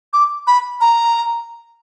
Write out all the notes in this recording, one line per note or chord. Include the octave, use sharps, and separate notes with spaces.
D6
B5
A#5